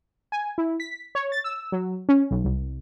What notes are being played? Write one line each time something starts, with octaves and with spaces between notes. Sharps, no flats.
G#5
E4
B6
C#5
A6
E6
F#3
C#4
B1
C2